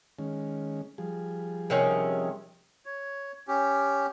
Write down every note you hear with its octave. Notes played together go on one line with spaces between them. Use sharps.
D#3 G#3 C#4
F3 G3 G#4
C3 D#3 C#4
C#5
C#4 G4